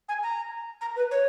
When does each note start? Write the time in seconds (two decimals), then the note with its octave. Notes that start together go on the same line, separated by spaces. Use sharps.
0.09 G#5
0.23 A#5
0.81 A#5
0.96 B4
1.11 C#5